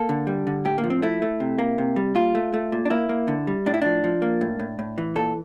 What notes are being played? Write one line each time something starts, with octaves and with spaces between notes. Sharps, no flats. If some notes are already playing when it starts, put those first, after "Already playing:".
Already playing: A#3 A4
D3
G3
D3
A2 G4
A#3
F3
C4
A3 E4
A3
C3
A#3
C3
G3
A#2 F4
A3
A3
A#2
D4
A#3 E4
A#3
D3
G3
A2 D4
E4
F3 D4
F3
A#3
A2
A2
A2
E3
A#2 A4